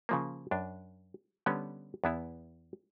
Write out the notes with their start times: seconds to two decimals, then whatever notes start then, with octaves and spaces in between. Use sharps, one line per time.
0.09 C#3 F3 A#3
0.51 F#2 D4
1.46 D3 G3 B3 C#4
2.04 E2 B3 E4